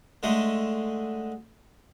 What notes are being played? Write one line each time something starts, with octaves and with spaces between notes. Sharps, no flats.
D3 G#3 A3